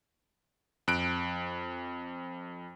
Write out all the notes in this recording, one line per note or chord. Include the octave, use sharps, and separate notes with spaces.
F2 F#6 D7